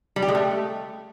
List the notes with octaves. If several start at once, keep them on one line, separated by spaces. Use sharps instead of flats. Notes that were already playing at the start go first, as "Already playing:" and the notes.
G3
G4
G#3
A3